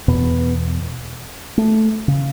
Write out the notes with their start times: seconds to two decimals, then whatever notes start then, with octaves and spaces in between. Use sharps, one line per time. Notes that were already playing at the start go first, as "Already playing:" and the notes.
0.08 E2 B2 B3
1.57 A3
2.08 C#3